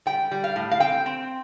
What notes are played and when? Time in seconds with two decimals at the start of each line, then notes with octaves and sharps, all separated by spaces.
0.06 G3 G5
0.31 G3
0.44 F5
0.56 A2
0.71 F5
0.80 C4 G5
1.06 C4